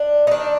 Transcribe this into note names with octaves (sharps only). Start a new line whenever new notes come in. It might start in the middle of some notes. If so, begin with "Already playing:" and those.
Already playing: D4
D#4
D#3 D4